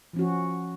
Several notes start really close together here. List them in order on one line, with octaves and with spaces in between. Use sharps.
F3 C#4 F#4